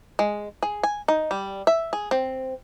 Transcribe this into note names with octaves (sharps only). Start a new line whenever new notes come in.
G#3
G#4
G#5
D#4
G3
E5
G#4
C4